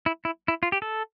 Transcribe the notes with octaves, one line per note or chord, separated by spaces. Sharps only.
E4
E4
E4
F4
G4
A4